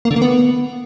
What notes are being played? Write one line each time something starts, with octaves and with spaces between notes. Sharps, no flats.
A#3
D3
A#3
B3